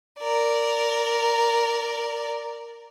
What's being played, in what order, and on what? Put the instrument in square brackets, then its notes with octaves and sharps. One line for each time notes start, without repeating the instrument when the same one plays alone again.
[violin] A#4 D5